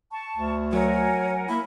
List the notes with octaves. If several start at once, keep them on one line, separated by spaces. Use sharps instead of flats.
A5 C#6
D2
F#3 A#4 C#5 F#5 G#5
A#3 E4